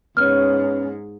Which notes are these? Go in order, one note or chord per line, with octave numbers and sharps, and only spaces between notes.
G#2 B3 C#4 B4 C#5 F6